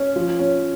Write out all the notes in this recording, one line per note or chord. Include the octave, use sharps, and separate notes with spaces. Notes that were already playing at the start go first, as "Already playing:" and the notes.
Already playing: C#4
F3
C#4